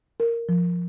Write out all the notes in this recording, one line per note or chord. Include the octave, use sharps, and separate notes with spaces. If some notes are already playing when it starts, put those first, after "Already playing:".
A#4
F3